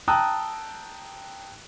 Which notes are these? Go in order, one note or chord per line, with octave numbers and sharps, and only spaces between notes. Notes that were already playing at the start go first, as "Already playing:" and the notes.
G5 A5 A#5 D#6 E6 F#6